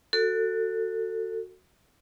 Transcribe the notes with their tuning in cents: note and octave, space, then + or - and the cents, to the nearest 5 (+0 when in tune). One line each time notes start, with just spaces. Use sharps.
F#4 +0 A4 +25